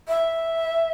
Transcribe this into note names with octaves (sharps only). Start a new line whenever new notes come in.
E5